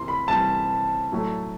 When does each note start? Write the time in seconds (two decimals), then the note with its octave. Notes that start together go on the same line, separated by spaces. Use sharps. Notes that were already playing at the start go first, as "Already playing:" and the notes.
Already playing: C3 E3 C6
0.08 B5
0.28 C3 E3 G3 A5
1.12 A2 F#3 A3